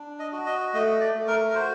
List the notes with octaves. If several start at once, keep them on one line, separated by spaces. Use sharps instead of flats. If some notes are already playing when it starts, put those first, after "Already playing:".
Already playing: D4
D#5
F#4
D#5
A3 D#5
D5
A3
A#4
A#4
F#4 C5